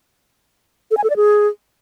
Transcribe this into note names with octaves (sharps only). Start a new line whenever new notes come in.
A4
G#5
A4
D5
G#4